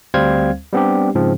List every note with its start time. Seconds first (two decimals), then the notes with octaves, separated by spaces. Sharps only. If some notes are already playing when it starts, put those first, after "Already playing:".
0.14 D2 G3 C4 C5 F5 G#6
0.73 G3 B3 C4 D4 G4
1.15 G#2 C#3 F3 C4